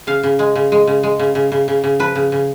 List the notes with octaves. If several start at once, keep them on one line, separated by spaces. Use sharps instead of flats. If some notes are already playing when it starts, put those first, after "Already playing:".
C#3 F5
C#3
G#3
C#3
G#3
C#3
G#3
C#3
C#3
C#3
C#3
C#3
F3 B4
C#3
C#3